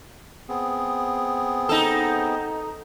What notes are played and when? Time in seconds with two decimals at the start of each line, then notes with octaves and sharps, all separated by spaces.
0.49 B3 C4 G#4
1.69 D#4 A4